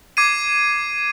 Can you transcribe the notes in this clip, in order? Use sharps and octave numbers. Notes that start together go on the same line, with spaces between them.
D6 G#6 C7 D#7